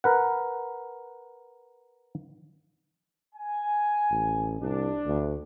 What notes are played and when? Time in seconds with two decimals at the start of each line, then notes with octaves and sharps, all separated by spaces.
0.04 A#4 B4 F#5
3.35 G#5
4.11 A1
4.62 C2 D4
5.06 D2